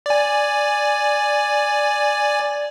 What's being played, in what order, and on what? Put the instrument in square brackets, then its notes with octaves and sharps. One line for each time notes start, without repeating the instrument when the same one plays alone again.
[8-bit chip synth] D5 G#5